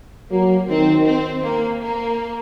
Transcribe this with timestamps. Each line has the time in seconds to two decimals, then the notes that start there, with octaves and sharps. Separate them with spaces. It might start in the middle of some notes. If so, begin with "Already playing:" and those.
0.31 F#3 A#3
0.69 D#3 C4
1.06 C4
1.44 A#3
1.82 A#3